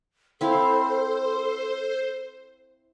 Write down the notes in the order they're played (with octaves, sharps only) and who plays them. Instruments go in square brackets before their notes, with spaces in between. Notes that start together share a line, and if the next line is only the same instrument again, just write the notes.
[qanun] C4 E4 F5 [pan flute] A4 [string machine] C5